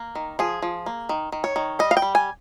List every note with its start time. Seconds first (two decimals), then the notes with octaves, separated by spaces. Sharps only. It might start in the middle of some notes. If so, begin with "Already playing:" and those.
Already playing: A#3
0.15 D#3
0.39 F3 G#4
0.62 F3
0.86 A#3
1.09 D#3
1.32 D#3
1.44 C#5
1.56 D#3
1.79 G3 D#5
1.91 F5
1.97 G5
2.02 G3
2.15 G#5